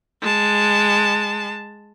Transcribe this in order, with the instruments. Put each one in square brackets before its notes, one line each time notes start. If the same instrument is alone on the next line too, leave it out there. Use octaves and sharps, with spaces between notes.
[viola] G#3 A5